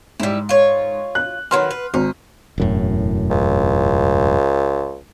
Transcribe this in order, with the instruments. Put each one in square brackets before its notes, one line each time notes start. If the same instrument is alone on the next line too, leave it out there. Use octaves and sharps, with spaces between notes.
[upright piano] G#2 [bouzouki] G3 E4
[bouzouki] F4 C#5
[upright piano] F#6
[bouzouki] D#3 F#3 B4 [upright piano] C6 F6
[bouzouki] B4
[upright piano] G#1 [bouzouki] D#4
[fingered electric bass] E1 F#2 A2
[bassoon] C#2